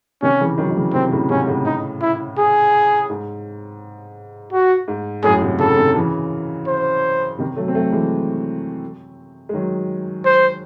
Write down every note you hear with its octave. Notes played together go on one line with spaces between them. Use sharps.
C3 D#3 C#4
C#3 E3
D#3 F#3
D#3
C#3 E3
C3 D#3 C4
A2 C#3
G#2 C3 C#4
A2 C#3
D#4
E4
G#4
G#2
F#4
G#2
F#2 A2 G#4
G#2 C3
A2 C#3 A4
C3 D#3
C#3 E3
C5
C3 D#3
F#3 A3
C4
F#3 A3
E3 G#3
G#3
D#3 F#3
C5